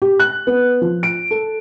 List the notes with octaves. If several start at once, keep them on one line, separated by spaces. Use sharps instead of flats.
G4
F#6
B3
F3
D7
A4